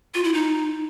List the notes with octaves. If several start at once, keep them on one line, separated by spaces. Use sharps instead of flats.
F4
E4
D#4